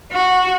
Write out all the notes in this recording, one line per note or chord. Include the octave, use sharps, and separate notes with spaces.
F#4